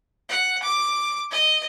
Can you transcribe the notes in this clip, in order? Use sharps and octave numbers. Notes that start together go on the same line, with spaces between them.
F#5
D6
D#5